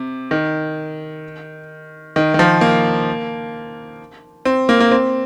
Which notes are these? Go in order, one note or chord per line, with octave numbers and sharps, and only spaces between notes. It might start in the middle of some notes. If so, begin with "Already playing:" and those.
Already playing: C3
D#3
D#3
D#3
F3
A#3
C4
A#3
A#3
C4